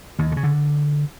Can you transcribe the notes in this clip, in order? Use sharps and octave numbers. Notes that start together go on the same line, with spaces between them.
D#2 D#3
D3
C#3
D3